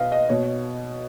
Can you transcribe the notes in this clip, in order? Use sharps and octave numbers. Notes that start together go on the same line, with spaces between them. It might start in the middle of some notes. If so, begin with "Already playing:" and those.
Already playing: B2 B4 D#5 F5
D#5
B2 C#5